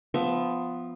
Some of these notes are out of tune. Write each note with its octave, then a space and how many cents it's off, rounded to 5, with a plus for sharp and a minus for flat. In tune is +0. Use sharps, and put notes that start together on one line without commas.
F3 +0 B3 +15 E5 +15